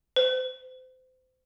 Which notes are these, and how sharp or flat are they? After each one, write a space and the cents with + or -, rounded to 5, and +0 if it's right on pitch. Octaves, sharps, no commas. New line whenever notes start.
C5 -30